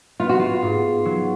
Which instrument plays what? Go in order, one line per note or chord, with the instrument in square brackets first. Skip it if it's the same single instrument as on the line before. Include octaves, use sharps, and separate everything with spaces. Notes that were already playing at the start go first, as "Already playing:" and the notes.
[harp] B3 [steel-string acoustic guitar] F4
[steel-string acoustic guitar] F#4
F4
[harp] G#2
F#3